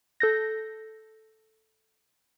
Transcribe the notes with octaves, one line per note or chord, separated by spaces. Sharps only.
A4 G6 A#6